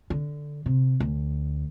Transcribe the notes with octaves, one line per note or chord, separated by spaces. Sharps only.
D3
C3
D2